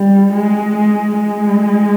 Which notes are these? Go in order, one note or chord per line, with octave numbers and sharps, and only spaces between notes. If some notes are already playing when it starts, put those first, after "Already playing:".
Already playing: G3
G#3
G#3
G#3